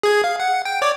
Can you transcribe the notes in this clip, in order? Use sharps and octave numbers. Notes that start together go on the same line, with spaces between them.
G#4 G#6
F5
F#5
G5
C#5 D5 D6